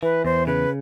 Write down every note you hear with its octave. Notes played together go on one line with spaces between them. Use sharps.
E3 B4
E2 C5
C#3 B4